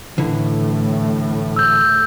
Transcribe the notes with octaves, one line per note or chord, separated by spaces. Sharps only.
A2 D3 E3 A3
E6 G6